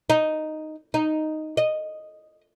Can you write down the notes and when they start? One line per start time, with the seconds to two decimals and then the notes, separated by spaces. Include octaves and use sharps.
0.10 D#4
0.94 D#4
1.57 D#5